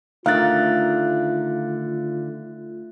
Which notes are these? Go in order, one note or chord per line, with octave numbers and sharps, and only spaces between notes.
D3 D#3 A3 F4 F5 F#6 A6